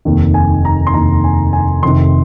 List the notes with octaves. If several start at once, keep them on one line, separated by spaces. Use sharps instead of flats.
F1 D#2 D#3
G#5
A#5
C6
F1 D#2 D#3 A#5
G#5
G#5
F1 F2 C3 D#3 C6